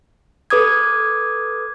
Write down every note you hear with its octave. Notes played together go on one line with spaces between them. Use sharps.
A4 B4 D6 D#6 G#6